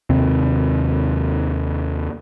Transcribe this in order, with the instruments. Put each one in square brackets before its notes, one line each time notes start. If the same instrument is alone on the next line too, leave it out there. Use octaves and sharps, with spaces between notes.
[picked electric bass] D#2 C3 C4